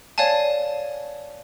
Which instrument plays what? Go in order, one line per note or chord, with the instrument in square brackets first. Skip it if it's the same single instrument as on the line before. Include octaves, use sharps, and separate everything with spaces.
[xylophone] C#5 D5 F5 G#5 A5